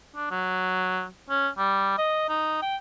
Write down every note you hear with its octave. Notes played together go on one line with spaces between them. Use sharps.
D4
F#3
C#4
G3
D#5
D#4
G5